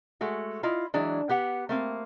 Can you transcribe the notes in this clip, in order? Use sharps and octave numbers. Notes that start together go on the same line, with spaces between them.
G#3 A3 F#4
E4 F4 D#5
E3 F#3 G#3 D4
B3 G4 F#5
A3 A#3 C4